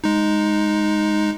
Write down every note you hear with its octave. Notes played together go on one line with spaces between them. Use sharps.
G#3 D#4